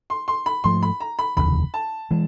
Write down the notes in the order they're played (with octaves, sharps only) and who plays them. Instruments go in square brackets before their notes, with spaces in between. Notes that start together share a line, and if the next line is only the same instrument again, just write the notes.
[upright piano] C6
C6
B5
[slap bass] G#2 F3 A3 [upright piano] C6
[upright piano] B5
A#5
B5
[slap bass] F1 D#2 C#3 E3 [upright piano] B5
[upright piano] A5
[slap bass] E3 G#3